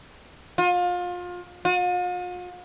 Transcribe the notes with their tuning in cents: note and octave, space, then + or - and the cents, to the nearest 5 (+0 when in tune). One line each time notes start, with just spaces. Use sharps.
F4 +30
F4 +45